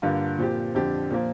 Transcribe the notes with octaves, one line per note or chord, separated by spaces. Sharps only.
G2 D3 A#3 F4
A#2 F3 C4 G4
F2 D3 F3 D4 G4
A#2 F3 A#3